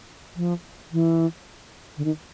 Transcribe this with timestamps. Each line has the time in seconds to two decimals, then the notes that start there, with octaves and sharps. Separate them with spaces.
0.36 F3
0.92 E3
1.97 D3
2.05 D#3